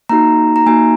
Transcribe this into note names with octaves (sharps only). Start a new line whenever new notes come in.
A#3 D#4 F#4 A#5
A#5
A#3 D#4 F#4 G#5